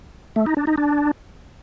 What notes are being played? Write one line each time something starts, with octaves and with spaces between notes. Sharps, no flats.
A3
D#4
D4
D#4
D4